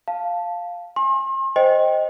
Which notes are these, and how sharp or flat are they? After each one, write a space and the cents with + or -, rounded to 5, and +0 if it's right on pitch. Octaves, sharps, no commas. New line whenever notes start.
F5 +0 A5 -5
G#5 +0 C6 +40
C5 +0 D#5 +0 G5 +0